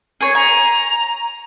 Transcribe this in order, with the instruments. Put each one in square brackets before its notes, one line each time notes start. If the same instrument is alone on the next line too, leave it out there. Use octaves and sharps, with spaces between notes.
[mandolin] G#4 C#5
[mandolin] G#5 [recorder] A#5